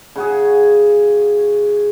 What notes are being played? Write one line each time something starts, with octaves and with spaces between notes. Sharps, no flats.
C#3 F#4 G#4